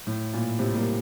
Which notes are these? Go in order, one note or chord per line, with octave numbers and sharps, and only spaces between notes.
A2
A#2
A2 C3
G3 A#3